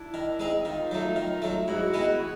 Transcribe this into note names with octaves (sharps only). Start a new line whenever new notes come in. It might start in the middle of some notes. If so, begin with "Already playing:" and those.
Already playing: D4 E4
D#3
G#3 C4 D#4
D#3 D#4 F4
F#3 A3
D#3
F#3 A3
G#2 E4 F#4
D#3 G#3 B3
F#4 G#4